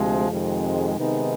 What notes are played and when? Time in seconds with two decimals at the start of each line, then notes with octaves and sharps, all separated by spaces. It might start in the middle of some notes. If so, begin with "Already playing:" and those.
Already playing: D2 C3 F3 G#3
0.29 F2 C3 D#3 G#3
0.97 C3 D#3 G#3 B3 D#4